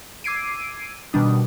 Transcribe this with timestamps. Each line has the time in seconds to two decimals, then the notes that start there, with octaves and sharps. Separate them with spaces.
0.24 D6 E6 G#6 C7 D7 D#7
1.13 B2 D#3 G3 D4 D#6